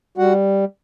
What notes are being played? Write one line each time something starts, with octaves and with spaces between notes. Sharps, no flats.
G3 F#4 F#5